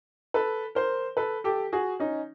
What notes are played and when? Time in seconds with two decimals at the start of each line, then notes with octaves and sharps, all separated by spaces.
0.34 A4 B4
0.75 A#4 C5
1.17 A4 B4
1.44 G4 A4
1.73 F#4 G#4
2.00 C#4 D#4